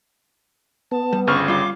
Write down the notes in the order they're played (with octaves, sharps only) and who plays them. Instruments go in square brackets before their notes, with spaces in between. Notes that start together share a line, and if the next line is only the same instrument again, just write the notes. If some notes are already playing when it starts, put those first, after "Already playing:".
[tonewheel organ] B3 [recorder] A5
[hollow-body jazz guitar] G3
[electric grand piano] G1 C#3 F6 [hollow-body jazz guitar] C5 [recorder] C#6
[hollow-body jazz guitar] G3 F4 [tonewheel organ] C6 [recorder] D6